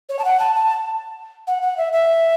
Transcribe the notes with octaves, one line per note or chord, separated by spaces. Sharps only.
C#5
A5
F#5
A5
A5
F#5
F#5
E5
E5